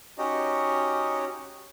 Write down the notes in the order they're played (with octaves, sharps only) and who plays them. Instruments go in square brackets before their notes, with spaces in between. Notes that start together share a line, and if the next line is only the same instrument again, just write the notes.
[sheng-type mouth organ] C#4 D#4 F#4 G4 C#5 D#5